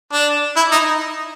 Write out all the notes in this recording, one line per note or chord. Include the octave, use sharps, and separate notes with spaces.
D4
E4
D#4